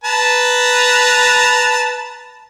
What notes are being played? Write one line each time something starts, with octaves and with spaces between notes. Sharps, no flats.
B4 A5 A#5